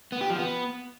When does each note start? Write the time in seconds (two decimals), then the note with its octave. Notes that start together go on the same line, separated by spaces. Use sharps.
0.12 B3
0.21 G4
0.30 F3
0.39 B3